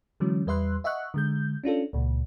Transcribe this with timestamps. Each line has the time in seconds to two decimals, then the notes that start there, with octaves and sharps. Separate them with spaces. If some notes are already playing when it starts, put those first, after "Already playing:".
0.20 D3 E3 F#3 G#3 C#4
0.46 E2 G3 B4 E5 C6 F#6
0.84 D#5 E5 F#5 C#6 F#6
1.14 D3 G#3 G6
1.64 C#4 D4 F4 A4
1.93 C#2 A#2